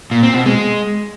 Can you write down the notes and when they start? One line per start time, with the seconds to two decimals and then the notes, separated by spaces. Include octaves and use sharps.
0.11 A#2
0.23 C4
0.34 B2
0.45 G#3